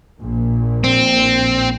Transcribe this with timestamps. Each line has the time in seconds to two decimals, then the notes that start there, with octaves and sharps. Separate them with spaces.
0.21 A#1 A#2
0.84 C4